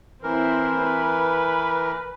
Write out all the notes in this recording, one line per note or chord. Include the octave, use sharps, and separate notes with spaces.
E3 C4 E4 A#4
B4